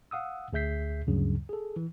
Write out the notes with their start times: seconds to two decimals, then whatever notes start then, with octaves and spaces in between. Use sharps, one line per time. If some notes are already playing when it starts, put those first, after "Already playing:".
0.11 F5 F#5 D#6 E6
0.53 D2 G#4 E5 G6 B6 C7
1.08 D2 G2 C#3 F#3
1.49 G#4 A4
1.76 E3